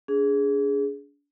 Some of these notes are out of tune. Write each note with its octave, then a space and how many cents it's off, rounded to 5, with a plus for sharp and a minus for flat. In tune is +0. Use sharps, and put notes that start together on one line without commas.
D4 -40 G#4 +0